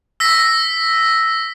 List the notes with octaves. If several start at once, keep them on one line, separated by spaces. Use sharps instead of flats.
E6 A#6 B6